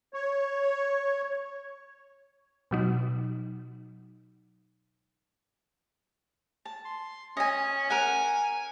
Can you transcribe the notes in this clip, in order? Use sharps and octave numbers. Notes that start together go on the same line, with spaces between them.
C#5
B2 F#3 D#4
A5
C6
C#4 D#5 G#5
A#4 F#5 G#5